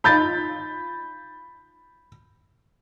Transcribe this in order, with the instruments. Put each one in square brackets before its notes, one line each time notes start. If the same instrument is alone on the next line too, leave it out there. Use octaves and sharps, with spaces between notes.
[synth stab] D#4 F4 [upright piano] B5 G6 A6